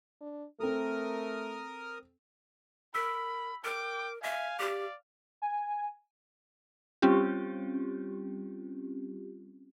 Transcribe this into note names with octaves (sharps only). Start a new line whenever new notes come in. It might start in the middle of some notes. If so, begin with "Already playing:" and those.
D4
A3 C4 A4 A#4 D#6 F6
A#4 B5 E6 B6
A#4 G5 D6
E5 F5 G#5
G4 D5
G#5
G3 C4 C#4 F4 G4